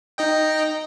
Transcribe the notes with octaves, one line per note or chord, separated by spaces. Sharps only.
D#4 D#5 G5